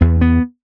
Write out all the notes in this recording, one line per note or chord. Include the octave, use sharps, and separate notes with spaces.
E2 B3
B3